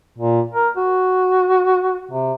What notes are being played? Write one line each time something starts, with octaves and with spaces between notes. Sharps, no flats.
A#2
A#4
F#4
C3